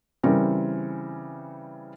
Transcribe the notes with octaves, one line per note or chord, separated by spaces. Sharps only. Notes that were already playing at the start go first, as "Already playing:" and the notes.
C#3 E3 G3 C4 A#4